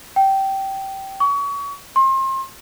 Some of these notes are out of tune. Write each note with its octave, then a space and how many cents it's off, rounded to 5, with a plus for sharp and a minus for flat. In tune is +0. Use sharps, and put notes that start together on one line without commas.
G5 -15
C#6 +30
C6 +35